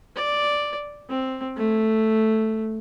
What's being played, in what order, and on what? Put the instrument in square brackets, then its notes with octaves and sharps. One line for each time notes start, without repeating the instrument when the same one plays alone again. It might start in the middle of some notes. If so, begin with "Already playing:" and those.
[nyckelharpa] D5
C4
A3